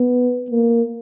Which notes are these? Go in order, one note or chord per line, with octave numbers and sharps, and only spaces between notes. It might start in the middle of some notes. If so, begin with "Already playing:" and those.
Already playing: B3
A#3